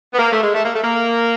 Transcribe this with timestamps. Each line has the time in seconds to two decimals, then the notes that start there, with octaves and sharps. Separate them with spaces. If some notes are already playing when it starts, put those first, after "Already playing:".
0.13 B3
0.18 A#3
0.32 A3
0.43 G#3
0.54 A3
0.64 A#3
0.74 A3
0.84 A#3